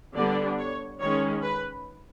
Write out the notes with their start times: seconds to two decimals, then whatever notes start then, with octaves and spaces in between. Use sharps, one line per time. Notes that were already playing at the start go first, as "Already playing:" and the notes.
0.15 D3 G3 B3 D4 D5
0.59 C#5
1.00 D#3 G#3 C#4 C#5
1.43 B4